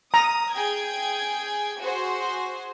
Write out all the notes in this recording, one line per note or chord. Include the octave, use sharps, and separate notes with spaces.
A#5 D#6
G#4 G5 G#6
F#4 G#4 C5